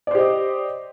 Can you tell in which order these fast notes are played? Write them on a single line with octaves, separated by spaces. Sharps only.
D5 C5 G4 D#5